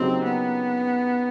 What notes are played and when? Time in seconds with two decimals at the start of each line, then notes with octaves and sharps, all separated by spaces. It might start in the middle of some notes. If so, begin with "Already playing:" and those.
Already playing: C#3 F#3 A#3 C4 D#4 G4
0.24 B3